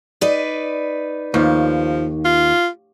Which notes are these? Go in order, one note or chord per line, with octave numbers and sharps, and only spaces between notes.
D#4 B4 D5
D#2 F3
F4